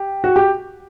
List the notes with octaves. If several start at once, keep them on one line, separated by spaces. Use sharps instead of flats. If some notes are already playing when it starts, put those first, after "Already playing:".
Already playing: G4
F#4
G4